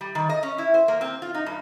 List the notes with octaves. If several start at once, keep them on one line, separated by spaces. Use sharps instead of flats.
G3
D#3
D#5
C#4
E4
C5
A#3
C4
F4
D#4
G2